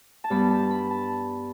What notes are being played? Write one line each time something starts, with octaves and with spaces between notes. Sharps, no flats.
A5
G2 G3 B3 B5
A5
B5
A5